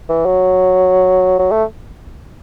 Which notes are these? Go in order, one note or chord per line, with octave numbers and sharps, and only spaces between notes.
E3
F#3
F#3
A3